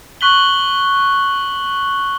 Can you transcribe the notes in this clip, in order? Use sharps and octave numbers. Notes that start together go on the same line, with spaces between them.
C#6 F#6 B6 F#7 G7